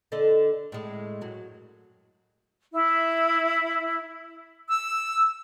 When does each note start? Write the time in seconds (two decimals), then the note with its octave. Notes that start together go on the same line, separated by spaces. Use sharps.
0.12 D3 A4 D#5
0.72 A2 G#3
1.21 F#2 F#3
2.73 E4
4.68 E6